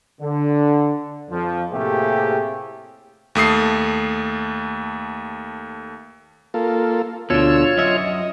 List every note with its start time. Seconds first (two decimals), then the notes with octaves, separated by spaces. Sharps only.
0.21 D3
1.31 F2 F3
1.72 A2 C3 A3 A#3 G4 G#4
3.35 D#2 A3 D#6 C7
6.54 A#3 F4 A4
7.30 D2 B2 D3 F4 C#5 E6
7.78 F#2 D#5 E5